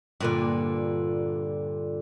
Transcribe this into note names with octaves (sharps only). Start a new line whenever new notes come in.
G2 A#2 D3